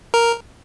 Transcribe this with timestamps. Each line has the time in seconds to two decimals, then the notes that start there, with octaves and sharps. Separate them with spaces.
0.14 A#4